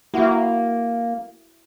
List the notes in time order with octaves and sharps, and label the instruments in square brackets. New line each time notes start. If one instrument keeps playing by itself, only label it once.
[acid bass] A#3 [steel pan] E4 F#4